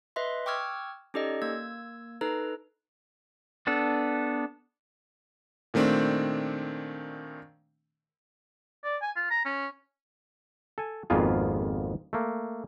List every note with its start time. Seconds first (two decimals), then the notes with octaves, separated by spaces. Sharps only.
0.16 B4 D#5 E5 C6
0.46 G5 C#6 D6 E6 F6 G#6
1.14 C#4 D#4 G4 A4 D5 D#5
1.42 A#3 E6 G#6
2.21 D#4 A4 B4 A#5
3.67 B3 D4 A4
5.74 A#2 D#3 A3 C4 D4
8.84 D5
9.02 G#5
9.16 F4
9.30 A#5
9.45 C#4
10.78 A4 G#5
11.10 G#1 F2 A#3 B3 F4 G#4
12.13 A3 A#3